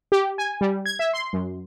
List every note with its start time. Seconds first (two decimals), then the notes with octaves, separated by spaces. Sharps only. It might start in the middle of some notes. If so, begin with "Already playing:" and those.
0.12 G4
0.38 G#5
0.61 G3
0.86 G#6
0.99 E5
1.13 C6
1.33 F#2